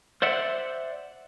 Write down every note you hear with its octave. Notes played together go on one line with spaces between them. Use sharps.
C5 D5 E5 F#5